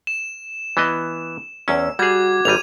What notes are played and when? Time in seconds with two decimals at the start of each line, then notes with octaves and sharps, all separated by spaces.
0.07 E7
0.77 E3 B3 D#5
1.68 E2 C#4 E6
1.99 G3 F#4 G#4 D6 G#6
2.45 G#1 G3 D#7 F7